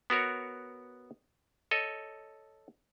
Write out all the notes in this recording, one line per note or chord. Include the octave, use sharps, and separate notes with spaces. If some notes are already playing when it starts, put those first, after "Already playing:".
B3 F#4 A#4 C#5
A4 C#5 D#5